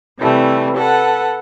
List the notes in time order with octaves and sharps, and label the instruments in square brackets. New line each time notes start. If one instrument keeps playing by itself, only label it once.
[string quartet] C3 E3 G3 A3
A4 B4 F#5